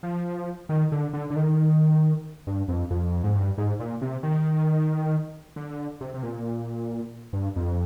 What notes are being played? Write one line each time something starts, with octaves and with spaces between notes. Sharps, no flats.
F3
D#3
D3
D3
D3
D#3
G2
F2
F2
G#2
G2
G#2
A#2
C3
D#3
D3
C3
C3
A#2
G2
F2